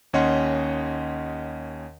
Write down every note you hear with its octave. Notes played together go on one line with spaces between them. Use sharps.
D#2 C#4 C#5 D#5 F#5 C6